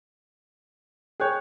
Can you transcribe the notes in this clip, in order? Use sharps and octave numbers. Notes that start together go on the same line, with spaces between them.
G#4 C#5 G5 F#6 G6